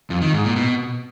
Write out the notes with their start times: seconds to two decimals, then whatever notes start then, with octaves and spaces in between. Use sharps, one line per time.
0.10 F2
0.22 D#3
0.33 G#2
0.44 A#2
0.56 B2